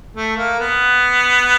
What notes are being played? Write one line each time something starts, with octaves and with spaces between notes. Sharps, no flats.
A3
A#3
B3